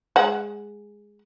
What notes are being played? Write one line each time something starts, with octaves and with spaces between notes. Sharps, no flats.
G#3 F#5